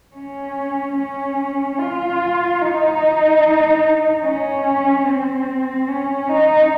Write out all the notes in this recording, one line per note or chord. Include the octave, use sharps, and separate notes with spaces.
C#4
C#4
F4
D#4
C#4
C4
C#4
D#4